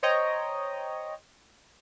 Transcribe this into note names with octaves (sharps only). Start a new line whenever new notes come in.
C5 C#5 D#5 G5 A#5